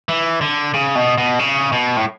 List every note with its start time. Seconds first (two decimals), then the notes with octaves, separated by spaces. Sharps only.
0.09 E3
0.41 D3
0.74 C#3
0.95 B2
1.18 B2
1.39 C#3
1.72 B2
1.96 A2